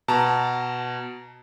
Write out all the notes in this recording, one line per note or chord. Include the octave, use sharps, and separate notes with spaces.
B2 A5 A#5